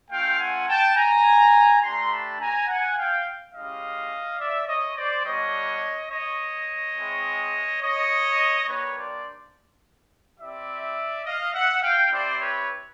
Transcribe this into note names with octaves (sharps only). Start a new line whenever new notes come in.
A3 C#4 F4 F5 G5
F#5 G#5
G5 A5
G#5 A#5
A3 D4 G4 A#5 C6
A5 B5
G#5 A#5
F#5 G#5
F5 G5
G#3 C#4 E4 G4 D#5 F5
D5 E5
C#5 D#5
C5 D5
G3 B3 D4 C#5 D#5
C#5 D#5
G#3 C4 E4
C#5 D#5
A#3 D4 G4 B4 C#5
C5 D5
C4 E4 G4 D5 E5
D#5 F5
E5 F#5
F5 G5
C4 E4 G4 C5 D5
B4 C#5